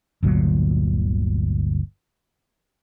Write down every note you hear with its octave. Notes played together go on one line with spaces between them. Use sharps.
G1 D2 A#2 F#3